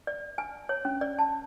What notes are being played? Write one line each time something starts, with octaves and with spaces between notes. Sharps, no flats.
D5
G#5
C#5
C#4
D5
A5